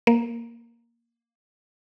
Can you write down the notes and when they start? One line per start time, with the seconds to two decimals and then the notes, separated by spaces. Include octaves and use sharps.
0.07 A#3